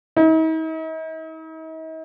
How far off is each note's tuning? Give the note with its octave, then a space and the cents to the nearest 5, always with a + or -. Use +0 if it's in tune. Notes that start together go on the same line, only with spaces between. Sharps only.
D#4 +45